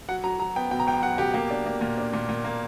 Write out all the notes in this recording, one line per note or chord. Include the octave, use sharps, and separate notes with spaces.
F#3 F#5
F#3 A#5
F#3 A#5
B3 G5
B2 G5
A#5
C#2 G5
F#3 F#5
B2 G4
A#3 G4
D4
A#3
A#2
D4
A#2
A#2
A#3